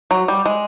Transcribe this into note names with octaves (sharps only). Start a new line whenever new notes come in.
F#3
G3
G#3